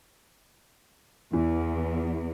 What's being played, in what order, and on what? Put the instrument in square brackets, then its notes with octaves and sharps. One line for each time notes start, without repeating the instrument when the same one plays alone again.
[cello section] E2 [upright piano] E3